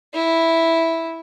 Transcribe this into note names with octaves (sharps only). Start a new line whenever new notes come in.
E4